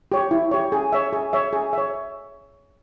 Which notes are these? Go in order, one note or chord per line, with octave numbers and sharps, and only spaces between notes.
G4 C#5
E4
G4 C#5
G#4
C#5 E5
G#4
C#5 E5
G#4
C#5 E5